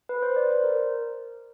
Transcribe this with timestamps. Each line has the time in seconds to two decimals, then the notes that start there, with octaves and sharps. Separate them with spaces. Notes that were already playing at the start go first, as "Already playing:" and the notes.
0.09 B4
0.23 C5
0.36 D5
0.50 C5
0.64 A#4